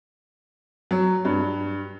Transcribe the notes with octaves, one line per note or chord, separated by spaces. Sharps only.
F#3
G2